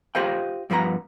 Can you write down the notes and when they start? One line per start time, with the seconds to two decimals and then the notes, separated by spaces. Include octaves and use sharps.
0.15 F4 G4 C5 D#5 F5 G5
0.70 G2 F3 B3 B4 A#5